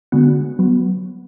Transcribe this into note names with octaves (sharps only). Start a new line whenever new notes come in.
D3 G#3 B3 F#4
F#3 B3